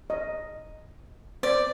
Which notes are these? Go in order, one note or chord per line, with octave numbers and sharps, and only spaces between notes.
D#5
C5 D5